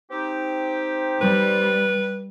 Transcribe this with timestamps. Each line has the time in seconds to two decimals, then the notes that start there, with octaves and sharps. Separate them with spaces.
0.11 C4 D#4 G4
1.21 G3 B4